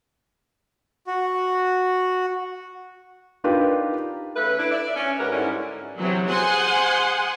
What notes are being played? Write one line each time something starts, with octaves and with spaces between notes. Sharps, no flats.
F#4
D4 D#4 F4 G4 A#4 B4
C#3 A3 B4
D4 E4
D5 E5
C#4
G#2 F#4 G4 A#4 B4
G#2 D3 G3 C#4 E4
C3 E3 F#3
G#4 C5 F#5 G#5 C6